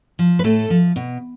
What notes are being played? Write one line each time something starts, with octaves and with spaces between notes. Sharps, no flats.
F3
B4
A2 A3 A4
F3
B2